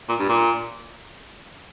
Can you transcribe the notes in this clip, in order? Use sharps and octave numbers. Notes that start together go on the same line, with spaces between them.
A#2
G2
A#2